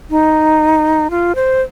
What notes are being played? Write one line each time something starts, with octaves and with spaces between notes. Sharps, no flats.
D#4
F4
C5